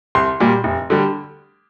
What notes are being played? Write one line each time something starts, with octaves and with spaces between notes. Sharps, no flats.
C2 C6
A#2 G3
F1
D3 G3